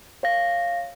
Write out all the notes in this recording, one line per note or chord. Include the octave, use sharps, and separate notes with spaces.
C#5 F5 A#6